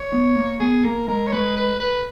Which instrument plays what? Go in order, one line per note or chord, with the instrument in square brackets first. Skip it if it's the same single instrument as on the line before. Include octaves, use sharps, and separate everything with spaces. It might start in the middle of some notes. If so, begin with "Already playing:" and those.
Already playing: [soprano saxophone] C#5
[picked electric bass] B3
A#3
[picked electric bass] B3 [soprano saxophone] G#4
[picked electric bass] A#3 [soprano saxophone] A#4
[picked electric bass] G#3 [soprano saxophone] A#4
[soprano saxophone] C#5
[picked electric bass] G#3 [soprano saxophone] B4
[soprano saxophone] B4
B4